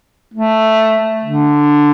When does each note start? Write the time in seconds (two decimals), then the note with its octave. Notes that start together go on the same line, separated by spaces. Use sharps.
0.34 A3
1.25 D3